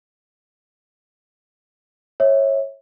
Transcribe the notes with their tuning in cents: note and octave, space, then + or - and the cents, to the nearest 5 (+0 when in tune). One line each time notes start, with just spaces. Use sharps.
C#5 -20 E5 -25